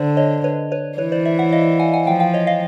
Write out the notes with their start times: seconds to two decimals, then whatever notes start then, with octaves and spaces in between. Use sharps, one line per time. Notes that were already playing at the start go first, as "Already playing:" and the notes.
Already playing: D3 C5 D5
0.17 C#5 D#5
0.44 B4 C#5
0.72 B4 C#5
0.98 E3 B4 C#5
1.12 C5 D5
1.25 D5 E5
1.39 E5 F#5
1.52 D#5 F5
1.80 F#5 G#5
1.93 F#5 G#5
2.07 F3 F5 G5
2.20 F5 G5
2.34 C#5 D#5
2.47 D#5 F5